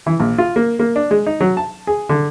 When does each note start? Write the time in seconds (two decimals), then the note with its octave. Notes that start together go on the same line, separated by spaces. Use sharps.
0.07 E3
0.20 A#1
0.38 F4
0.56 A#3
0.79 A#3
0.96 D4
1.11 G#3
1.26 D#4
1.41 F#3
1.57 A5
1.87 G#4
2.09 D3